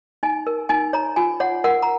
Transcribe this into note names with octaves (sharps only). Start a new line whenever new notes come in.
D#4 G#5
A#4
D#4 G#5
C#5 A#5
F4 G#5
C#5 F#5
A#4 F#5
A#5